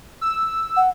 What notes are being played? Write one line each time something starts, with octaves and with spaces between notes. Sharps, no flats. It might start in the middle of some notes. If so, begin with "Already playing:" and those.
E6
F#5